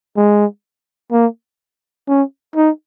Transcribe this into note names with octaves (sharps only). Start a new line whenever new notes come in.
G#3
A#3
C#4
D#4